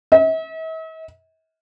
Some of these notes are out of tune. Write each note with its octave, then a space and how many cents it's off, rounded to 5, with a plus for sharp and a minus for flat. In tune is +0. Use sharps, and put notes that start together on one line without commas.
E5 -45